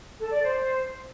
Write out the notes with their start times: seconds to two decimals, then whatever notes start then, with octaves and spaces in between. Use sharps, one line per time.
0.19 A4
0.31 D5
0.43 C5